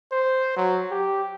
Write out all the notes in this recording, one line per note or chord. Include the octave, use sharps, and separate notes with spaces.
C5
F#3
G4